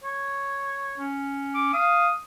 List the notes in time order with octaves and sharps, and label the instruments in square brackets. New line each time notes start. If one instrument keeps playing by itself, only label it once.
[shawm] C#5
[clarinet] C#4
[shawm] D6
[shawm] F5 [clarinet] D#6